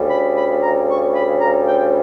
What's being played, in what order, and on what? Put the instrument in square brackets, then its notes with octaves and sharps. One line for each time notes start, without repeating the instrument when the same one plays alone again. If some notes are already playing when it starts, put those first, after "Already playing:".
Already playing: [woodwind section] D2 C#3 G3
B5
B5
A#5
C#6
B5
A#5
G5